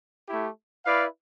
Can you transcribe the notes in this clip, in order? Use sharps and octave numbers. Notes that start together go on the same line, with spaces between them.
A3 E4 G4
E4 B4 D5 F5